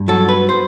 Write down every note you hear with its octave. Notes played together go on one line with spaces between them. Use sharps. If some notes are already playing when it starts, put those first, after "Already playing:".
Already playing: G2
F#3 A4
B4
C5